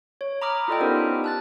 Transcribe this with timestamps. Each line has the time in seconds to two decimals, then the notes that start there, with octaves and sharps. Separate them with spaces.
0.21 C#5
0.42 A#5 B5 D6 D#6 F6
0.68 E4 F4 A4 D5 D#5 G5
0.80 B3 C#4 D#4 G4 A#4 C5
1.24 A5 F#6 A6